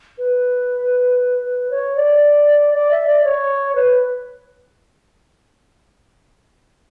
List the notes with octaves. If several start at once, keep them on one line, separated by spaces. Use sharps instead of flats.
B4
C#5
D5
D5
E5
D5
C#5
B4